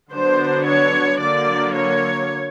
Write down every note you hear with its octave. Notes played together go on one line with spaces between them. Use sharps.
D3 F#3 B3 D4 C5
C#5
D3 F#3 A#3 D5
C#5